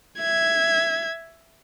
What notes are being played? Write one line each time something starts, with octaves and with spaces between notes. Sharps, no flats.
E5 G#6